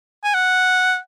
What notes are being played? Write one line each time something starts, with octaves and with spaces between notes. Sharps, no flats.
G#5
F#5